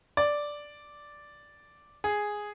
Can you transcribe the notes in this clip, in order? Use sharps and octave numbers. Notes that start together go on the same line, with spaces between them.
D5
G#4